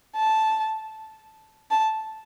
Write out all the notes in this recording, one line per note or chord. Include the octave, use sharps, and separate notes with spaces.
A5
A5